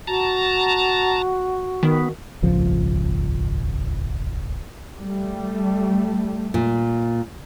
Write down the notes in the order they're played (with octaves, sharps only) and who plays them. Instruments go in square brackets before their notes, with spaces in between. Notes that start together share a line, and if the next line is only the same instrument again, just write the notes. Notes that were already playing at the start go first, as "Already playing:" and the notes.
[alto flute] F#4 [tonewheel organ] A5 A#5
[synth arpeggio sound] D#3 [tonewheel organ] B3
[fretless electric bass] D#1 G#1 C#2 F3
[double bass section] G3 A3
[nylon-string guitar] A#2